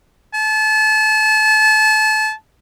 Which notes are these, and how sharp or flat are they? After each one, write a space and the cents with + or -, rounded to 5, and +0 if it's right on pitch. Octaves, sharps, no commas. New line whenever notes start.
A5 -30